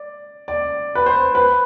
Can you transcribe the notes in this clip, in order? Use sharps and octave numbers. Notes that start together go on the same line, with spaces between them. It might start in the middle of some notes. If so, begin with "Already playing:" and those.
Already playing: D5
D5
B4
C5
B4